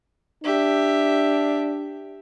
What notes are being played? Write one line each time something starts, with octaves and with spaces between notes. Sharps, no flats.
D4 G4 E5